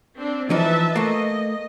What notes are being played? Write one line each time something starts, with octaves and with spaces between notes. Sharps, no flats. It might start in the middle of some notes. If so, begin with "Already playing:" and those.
C4 D4
E3 F3 D#4 B4 E5 A5
A3 A#3 D#5